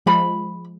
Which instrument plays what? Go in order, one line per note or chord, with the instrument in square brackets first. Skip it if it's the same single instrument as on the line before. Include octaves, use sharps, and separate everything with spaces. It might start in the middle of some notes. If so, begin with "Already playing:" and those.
[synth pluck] F3 G#3 [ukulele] B5